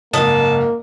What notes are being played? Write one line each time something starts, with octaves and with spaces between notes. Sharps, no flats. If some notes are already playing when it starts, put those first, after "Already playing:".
F#1 G#2 A#3 D#5 A5